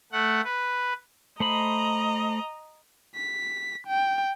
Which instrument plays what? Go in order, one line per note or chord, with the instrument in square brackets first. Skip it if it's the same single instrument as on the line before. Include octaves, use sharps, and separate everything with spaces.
[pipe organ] A3 F#5
B4
[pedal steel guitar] A3 C5 B5 [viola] D#5 A#5
[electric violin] B6
G5